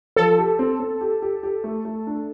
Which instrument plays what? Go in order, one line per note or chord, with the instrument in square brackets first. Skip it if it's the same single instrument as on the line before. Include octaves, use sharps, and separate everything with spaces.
[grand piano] F3 [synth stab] A4
[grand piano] G4
C4
C4
G4
G4
G4
A3
A3
D4